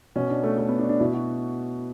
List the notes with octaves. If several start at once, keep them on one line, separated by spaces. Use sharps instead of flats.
B2 C#4
D4
A3
A3
B3
D4
D4
B2 E4
F#4